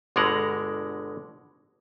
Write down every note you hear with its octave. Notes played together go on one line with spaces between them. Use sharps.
G1 B2 D3 G#3 A#4 F#5